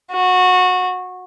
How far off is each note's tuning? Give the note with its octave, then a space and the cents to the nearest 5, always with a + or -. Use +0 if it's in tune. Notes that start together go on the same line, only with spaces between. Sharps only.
F#4 -20